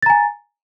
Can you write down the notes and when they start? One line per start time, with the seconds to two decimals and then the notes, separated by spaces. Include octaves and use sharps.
0.03 A6
0.06 A#5
0.10 G#5